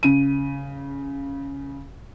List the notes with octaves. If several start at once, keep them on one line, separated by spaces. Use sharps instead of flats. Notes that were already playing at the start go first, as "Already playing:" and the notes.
C#3 D#7